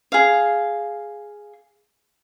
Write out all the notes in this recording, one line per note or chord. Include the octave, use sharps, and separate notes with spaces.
G#4 F5